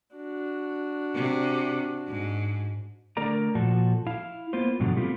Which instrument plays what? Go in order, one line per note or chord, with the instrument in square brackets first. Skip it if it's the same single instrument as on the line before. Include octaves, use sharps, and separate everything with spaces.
[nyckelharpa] D4 F#4
[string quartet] C3
G#2
[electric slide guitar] D3 A3 A#4 D5 A#5
A#2 F3 F#4 A4 A5
E4 F5
A#3 B3 F4 C5
G2 B2 D3 F3 F#3
A3 B3 C4 E4 F4 G4